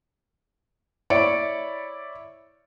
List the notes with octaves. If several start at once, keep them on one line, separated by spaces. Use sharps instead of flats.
E4 C#5 D5 C#7 D7